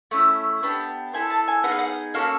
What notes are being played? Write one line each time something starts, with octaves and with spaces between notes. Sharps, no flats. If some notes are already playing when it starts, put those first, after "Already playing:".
A3 C#4 E4
B3 D4 G4
C4 E4 A4 G#5
A5
G#5
B3 D#4 G#4 F#5
F5
F#5
A#3 C#4 F#4 A4 F5